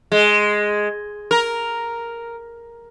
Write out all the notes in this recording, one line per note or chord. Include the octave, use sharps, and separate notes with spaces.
G#3
A#4